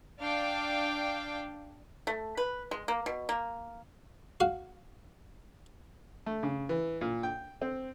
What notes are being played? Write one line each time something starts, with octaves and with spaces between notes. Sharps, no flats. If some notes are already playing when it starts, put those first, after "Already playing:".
D4 F5 G5 D6
A3
B4
G#3
A#3
B2
A#3
F#4 F5
A3
C#3
E3
A#2
G5
C4